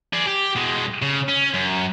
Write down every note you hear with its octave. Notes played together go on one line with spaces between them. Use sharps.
G#4 D5
G4
B2 G#3
C#3
C#4
F#2